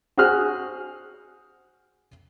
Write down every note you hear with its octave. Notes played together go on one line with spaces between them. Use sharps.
F#4 G#4 C5 D#6 F6 F#6